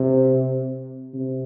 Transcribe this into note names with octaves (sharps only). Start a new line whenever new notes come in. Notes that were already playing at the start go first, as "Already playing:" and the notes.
Already playing: C3
C3